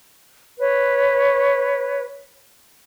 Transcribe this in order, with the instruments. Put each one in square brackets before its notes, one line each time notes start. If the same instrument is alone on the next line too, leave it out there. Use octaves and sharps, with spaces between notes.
[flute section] B4 C#5